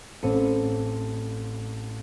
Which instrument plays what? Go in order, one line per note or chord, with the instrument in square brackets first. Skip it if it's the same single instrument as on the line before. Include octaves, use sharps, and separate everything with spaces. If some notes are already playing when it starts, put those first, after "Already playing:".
[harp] A1 C4 A4 C#7 D#7